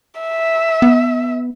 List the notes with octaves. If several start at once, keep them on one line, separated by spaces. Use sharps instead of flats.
E5
B3